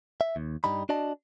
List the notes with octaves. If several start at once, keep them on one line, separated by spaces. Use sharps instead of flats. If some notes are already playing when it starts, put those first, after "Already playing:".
E5
D#2
G2 G3 D#4 B5
D4 F#4 D5 D#5 A5